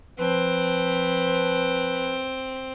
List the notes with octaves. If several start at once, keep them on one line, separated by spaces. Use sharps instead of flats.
F3 C4 B4